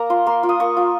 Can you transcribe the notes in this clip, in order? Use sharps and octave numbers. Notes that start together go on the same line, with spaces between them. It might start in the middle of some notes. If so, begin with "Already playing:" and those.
Already playing: A#3 A#5
F4 C6
A#3 C6
F4
D#6
A#3 C#6
F4